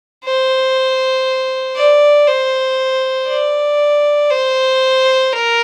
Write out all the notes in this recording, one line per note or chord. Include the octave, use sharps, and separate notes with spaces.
C5
D5
C5
D5
C5
A#4